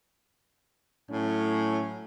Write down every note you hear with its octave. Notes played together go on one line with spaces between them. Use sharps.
A2 F#3 C#4